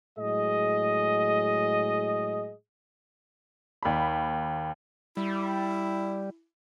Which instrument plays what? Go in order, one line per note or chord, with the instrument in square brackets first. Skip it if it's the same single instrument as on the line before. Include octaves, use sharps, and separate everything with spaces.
[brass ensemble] A2 F#3 G#3 G#4 D#5
[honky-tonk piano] D#2 B5
[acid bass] G3 [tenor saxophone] E4